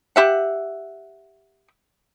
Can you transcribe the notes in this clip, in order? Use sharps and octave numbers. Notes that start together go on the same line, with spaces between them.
G4 E5 F#5